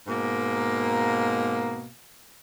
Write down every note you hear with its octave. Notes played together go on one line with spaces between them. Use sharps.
G#2 B2 A#3